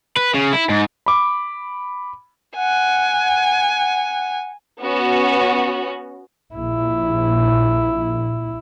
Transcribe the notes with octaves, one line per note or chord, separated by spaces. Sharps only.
B4
C#3
E4
G#2
B5 D6
F#5 G#5
B3 C#4 F#4
A#1 E4